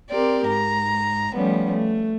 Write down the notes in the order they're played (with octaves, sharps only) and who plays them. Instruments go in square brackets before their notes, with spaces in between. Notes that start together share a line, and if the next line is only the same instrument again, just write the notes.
[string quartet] C4 G4 A#4 D5
G#2 A#5
F3 G3 A3 B3 C#4
A3